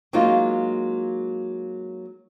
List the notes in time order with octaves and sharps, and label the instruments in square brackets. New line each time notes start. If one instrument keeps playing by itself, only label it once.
[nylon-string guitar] F#3 G#3 A#3 D#4 F4